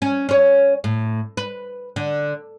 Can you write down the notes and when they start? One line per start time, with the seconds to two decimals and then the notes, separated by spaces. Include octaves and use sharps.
0.02 C#4
0.29 C#4 C#5
0.84 A2
1.37 B4
1.96 D3